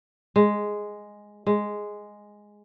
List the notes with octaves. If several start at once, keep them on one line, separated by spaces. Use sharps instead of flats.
G#3
G#3